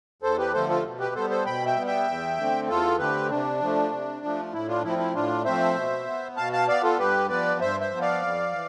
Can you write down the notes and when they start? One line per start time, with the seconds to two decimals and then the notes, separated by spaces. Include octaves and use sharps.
0.22 E2 A4 C5
0.38 G4 B4
0.53 D3 F3 A3 A4 C5
0.69 F4 A4
0.84 B2
1.00 G4 B4
1.15 G3 B3 A4 C5
1.30 A4 C5
1.46 B2 G5 B5
1.66 E5 G5
1.76 G3 B3
1.87 E5 G5
2.07 E2
2.37 D3 A3 C4
2.69 E2 F4 A4
2.99 D3 A3 C4 G4 B4
3.30 C3 D4
3.61 F3 A3
3.91 C3
4.23 F3 A3
4.53 A2 E4
4.68 D4 F4
4.83 F3 A3 C4 E4
4.99 E4
5.15 A2 D4 F4
5.45 F3 A3 C4 C5 E5
5.76 B2
6.07 B3
6.37 B2 F5 A5
6.53 F5 A5
6.68 B3 D5 F5
6.83 F4 A4
6.99 G2 G4 B4
7.29 F3 B3 B4 D5
7.60 G2 C5 E5
7.80 C5 E5
7.91 F3 B3
8.01 D5 F5
8.22 F2
8.52 E3